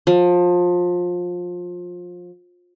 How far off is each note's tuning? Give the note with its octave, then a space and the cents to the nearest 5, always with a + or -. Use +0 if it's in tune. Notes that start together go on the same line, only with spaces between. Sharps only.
F3 +25